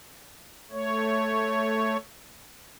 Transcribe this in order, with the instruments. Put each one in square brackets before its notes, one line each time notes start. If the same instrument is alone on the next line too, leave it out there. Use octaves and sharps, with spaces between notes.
[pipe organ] A3 C#5